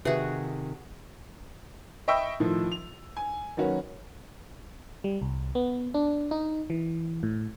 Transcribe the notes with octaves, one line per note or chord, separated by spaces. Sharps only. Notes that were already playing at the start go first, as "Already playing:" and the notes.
C3 D#3 F#4 G#4 B4 E5
D#5 E5 G5 B5 C#6 E6
A2 D#3 F3
F7
G#5
D#3 F#3 A#3 C#4 F#4 B4
G3
C2
B3
D4
D#4
E3
A2